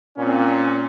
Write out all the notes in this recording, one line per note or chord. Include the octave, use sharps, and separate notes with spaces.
A#2 C4 C#4